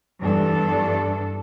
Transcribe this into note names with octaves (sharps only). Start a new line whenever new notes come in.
E2 G2 E3 D4 A4